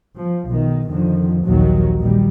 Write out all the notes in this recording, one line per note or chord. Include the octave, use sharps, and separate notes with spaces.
F3
B1 D#3
F2 D3 D#3 F3
A#1 D#2 D#3 F#3
A#2 D#3 G3